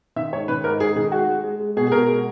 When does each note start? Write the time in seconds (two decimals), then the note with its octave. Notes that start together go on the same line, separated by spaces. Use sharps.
0.16 D#3 E5
0.32 G#2 C#5
0.48 D#3 B4
0.64 G#2 A#4
0.80 G#2 G#4
0.96 D#3 G#4
1.12 G#3 F#4
1.28 G#3
1.44 G#3
1.60 G#3
1.77 B2 G#4
1.87 G#4
1.92 B2 A#4
2.08 G#3